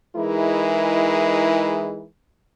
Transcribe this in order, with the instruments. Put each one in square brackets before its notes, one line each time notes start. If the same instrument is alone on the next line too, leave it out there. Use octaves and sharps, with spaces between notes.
[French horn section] E3 G#3 D#4 E4 G#4 A#4